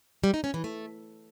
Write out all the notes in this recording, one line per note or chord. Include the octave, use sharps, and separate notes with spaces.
G3
D#4
C#4
E3
A3